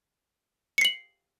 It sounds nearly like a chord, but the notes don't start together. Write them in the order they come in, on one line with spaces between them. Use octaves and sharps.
C#7 C7 F#7